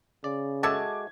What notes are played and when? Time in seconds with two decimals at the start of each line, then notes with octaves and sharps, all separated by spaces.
0.24 C#3 D5
0.63 G#3 F#4 A4 E5 A5 D6 G#6